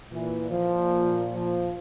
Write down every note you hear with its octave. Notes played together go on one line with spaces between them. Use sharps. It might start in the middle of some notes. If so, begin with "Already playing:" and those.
A#2 E3
F3
F3